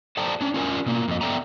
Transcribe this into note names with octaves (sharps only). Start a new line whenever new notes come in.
A4 C5 D5 G5 A5 A#5
C#4 D4
C#4 F4 A#4 D5 G#5
B2 A#3
F2 D#5
B3 A4 D5 E5 G5 A#5